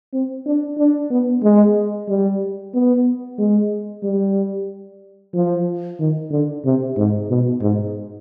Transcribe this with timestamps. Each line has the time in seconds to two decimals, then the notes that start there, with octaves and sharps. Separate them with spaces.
0.13 C4
0.46 D4
0.78 D4
1.11 B3
1.44 G#3
2.09 G3
2.74 B3
3.39 G#3
4.03 G3
5.34 F3
6.00 D#3
6.31 D3
6.65 C3
6.97 G#2
7.29 B2
7.61 G#2